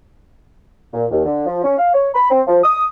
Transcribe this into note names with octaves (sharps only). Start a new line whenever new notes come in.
A#2
D#2
D3
F3
C#4
F5
C#5
B5
C4
F3
D#6